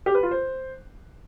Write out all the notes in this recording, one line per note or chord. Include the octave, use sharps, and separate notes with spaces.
G4
B4
F4
C5